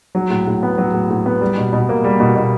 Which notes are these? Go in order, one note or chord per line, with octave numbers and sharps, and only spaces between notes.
F#3
A2
A2
B3
F#3
A2
A2
B3
G3
B2
B2
A#3
G3
B2
B2